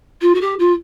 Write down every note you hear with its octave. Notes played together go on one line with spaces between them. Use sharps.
F4
F#4
G4
F4